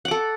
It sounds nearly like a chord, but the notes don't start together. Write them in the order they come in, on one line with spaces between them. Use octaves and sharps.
F#5 D6 A4